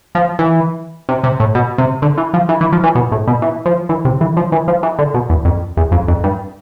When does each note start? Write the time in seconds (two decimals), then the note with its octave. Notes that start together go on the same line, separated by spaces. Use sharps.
0.15 F3
0.39 E3
1.09 C3
1.24 C3
1.40 A2
1.55 B2
1.78 C3
2.02 D3
2.17 E3
2.34 F3
2.49 E3
2.61 E3
2.72 F3
2.83 E3
2.95 B2
3.12 A2
3.28 B2
3.42 E3
3.66 F3
3.89 E3
4.05 C3
4.21 E3
4.37 F3
4.52 E3
4.68 F3
4.83 E3
4.99 D3
5.14 B2
5.30 E2
5.45 F2
5.77 E2
5.92 F2
6.08 F2
6.24 G2